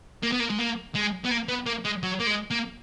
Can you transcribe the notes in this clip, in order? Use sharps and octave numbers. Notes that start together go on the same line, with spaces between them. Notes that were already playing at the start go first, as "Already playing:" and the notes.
A#3
B3
A#3
G#3
A#3
G#3
B3
A#3
B3
A#3
G#3
F#3
A#3
G#3
A#3